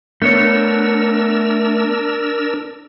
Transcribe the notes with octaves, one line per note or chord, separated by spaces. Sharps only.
A3 B3 D4 A#4 C#5 E6